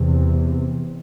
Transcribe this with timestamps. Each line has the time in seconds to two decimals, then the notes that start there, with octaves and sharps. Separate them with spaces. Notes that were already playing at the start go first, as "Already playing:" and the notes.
Already playing: E2 C3